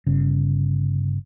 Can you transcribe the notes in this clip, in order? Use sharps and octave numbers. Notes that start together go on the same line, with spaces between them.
G1 C#3